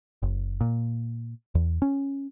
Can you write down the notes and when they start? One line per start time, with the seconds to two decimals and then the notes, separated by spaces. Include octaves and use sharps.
0.22 F#1
0.61 A#2
1.55 E2
1.82 C#4